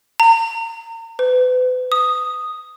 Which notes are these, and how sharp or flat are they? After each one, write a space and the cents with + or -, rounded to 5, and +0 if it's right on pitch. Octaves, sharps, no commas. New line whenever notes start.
A#5 -35
B4 +40
D#6 -5